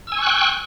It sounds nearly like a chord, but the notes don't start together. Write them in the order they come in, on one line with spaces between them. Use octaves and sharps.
E6 G#5 C#6 F#6 G5